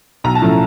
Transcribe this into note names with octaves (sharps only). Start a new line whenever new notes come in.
B1 A#5
A5
A2 F3 A3 C#4